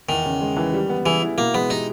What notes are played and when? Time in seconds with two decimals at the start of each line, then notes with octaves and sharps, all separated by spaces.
0.09 E2 D#3
0.25 C#3
0.41 G#3
0.57 E3
0.73 G3
0.89 B3
1.06 E3 G#4
1.22 E4
1.38 B2 A#3
1.54 G#3 B3
1.70 D#4 G4